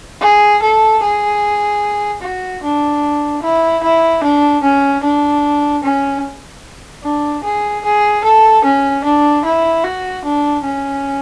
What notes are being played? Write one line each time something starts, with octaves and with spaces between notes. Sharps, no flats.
G#4
A4
G#4
F#4
D4
E4
E4
D4
C#4
D4
C#4
D4
G#4
G#4
A4
C#4
D4
E4
F#4
D4
C#4